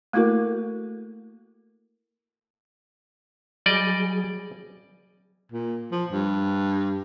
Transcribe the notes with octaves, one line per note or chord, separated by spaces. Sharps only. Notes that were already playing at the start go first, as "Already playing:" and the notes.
A3 A#3 E4 F#4 A4 A#4
F#3 G3 G#4 D5 D#5
A#2
F3
G2